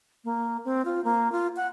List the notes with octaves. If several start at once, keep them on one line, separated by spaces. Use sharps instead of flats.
A#3
C4
F4
A#3
F4
F#5